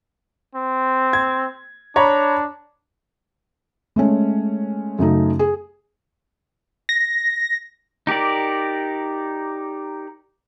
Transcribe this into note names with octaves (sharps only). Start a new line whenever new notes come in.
C4
G#6
D4 C#5 A#5 B5
G#3 A3 C#4
F#2 C#3 A3 D#4
G#4
A#6
D#4 G4 A#4 D5